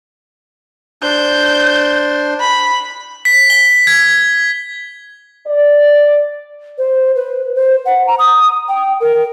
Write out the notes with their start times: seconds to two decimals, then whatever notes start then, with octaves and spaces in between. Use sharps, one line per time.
1.03 D4 C5 G6
2.40 B5
3.25 B6
3.50 G7
3.87 G#6
5.46 D5
6.78 C5
7.16 B4
7.55 C5
7.85 F#5
8.07 A#5
8.19 D#6
8.68 G5
9.00 A#4